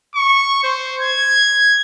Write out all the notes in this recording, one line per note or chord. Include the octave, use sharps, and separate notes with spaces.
C#6
C5
G#6